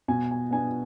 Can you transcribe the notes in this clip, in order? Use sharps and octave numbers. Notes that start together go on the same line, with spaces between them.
B2 G#5
G#5
B3 D4 G#5